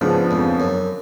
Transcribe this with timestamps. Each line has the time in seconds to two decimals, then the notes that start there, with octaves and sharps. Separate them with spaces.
0.01 G#2 C#3 F3 B3 D4
0.31 F2
0.60 F#2